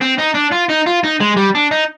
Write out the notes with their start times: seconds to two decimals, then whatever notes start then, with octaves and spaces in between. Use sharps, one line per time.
0.01 C4
0.18 D#4
0.34 D4
0.51 F4
0.69 D#4
0.86 F4
1.04 D#4
1.21 G#3
1.37 G3
1.55 D4
1.71 D#4